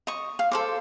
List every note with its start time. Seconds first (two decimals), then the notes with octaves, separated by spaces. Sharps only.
0.07 D#5 C#6
0.39 F5
0.51 A4 C5 D6